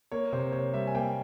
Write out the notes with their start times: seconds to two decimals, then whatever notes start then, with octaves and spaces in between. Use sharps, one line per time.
0.12 A#3 C#5
0.32 C3 C5
0.53 C3 C#5
0.74 G3 E5
0.87 G#5
0.95 A#3 G5